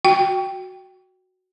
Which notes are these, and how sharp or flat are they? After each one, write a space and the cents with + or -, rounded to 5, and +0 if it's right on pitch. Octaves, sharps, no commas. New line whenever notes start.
F#4 +0 G5 +0